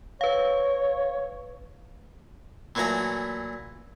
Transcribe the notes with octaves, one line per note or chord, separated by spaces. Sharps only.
B4 C#5 F5
A#2 E3 F#3 A3 A#5